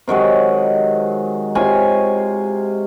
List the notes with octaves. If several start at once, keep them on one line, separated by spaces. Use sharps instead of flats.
C3 D#3 F#3 G#3
C3 F4 C#5 G#5